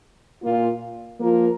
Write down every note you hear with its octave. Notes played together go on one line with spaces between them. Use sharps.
A#2 A#3 F4
F3 A#3 F4 A#4